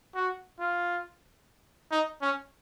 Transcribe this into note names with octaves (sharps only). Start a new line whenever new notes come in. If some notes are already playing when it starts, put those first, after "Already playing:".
F#4
F4
D#4
C#4